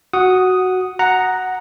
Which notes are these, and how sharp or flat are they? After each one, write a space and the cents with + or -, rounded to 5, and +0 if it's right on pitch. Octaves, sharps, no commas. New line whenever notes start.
F#4 +0 F#5 +0 D#6 +0
F#5 +0 A#5 +0